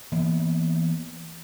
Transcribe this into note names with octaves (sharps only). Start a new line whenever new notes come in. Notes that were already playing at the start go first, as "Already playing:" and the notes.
E3 A#3 B3